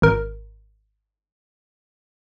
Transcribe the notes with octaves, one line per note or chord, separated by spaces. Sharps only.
G#1 A#4